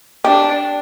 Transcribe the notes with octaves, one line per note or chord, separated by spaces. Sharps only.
D4 G4